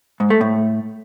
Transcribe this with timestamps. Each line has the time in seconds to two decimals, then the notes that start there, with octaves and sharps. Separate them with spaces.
0.20 G#2
0.30 A3
0.41 A2